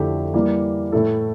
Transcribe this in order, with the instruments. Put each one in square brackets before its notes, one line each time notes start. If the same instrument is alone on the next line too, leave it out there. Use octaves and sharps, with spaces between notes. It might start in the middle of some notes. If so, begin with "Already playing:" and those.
Already playing: [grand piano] F2 D3 A3 E4 G4
E3 G3 A#3
A2 E3 A3 E4 A4